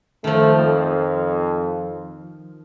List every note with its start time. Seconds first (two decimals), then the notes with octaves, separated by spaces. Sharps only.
0.24 D#3 F3 A3
0.54 F2